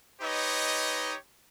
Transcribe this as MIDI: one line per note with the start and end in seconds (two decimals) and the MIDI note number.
0.22 1.14 63
0.22 1.14 67
0.22 1.14 71
0.22 1.14 73
0.22 1.14 75